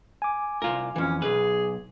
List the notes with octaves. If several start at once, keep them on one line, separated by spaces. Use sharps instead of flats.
G#5 D6
C2 F4 A#4
F2 E3 C#4
B1 G#2 G#4 B4